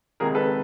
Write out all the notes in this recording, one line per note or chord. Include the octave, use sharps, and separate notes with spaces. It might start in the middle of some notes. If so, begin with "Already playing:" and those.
C#2 C3 D#3 G#4 A#4
A4 B4